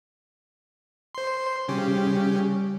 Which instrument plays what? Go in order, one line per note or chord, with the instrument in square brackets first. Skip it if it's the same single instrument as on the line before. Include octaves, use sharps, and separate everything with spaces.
[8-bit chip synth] C5 C6
[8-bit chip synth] C#3 C#4 G4 [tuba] G3